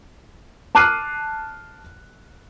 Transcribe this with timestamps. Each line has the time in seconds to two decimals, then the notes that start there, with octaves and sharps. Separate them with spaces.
0.75 A5 D6 F6 F#6 C7 D#7